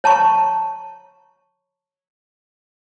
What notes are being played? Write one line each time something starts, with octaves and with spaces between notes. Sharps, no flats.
C#5 A5 A#5 C#6